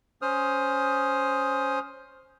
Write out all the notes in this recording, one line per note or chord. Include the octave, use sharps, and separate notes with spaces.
C#4 C5 D#6 F6